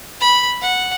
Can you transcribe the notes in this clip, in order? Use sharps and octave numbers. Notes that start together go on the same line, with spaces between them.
B5
F#5